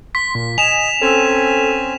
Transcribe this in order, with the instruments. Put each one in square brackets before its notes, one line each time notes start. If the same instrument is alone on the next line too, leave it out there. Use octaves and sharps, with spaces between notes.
[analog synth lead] C6 [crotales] B6
[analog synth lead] A#2
[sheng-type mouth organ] D#5 [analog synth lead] G#5 [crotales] E7 F7
[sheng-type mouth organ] C4 C#4 G#5 [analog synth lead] A4